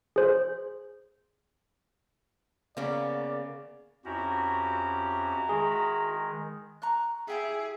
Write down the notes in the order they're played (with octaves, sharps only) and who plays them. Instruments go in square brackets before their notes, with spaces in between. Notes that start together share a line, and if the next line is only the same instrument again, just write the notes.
[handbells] G#4 C5
[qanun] C#3 C#4 [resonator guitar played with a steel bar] A#3 B3 [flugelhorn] D5
[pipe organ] F2 C#4 G4 [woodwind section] E4 F#4 A#5
[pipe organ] D#3 G#3 [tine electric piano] G#4
[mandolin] A#5 C#6 F#6
[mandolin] E4 G4 E5 [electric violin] G#4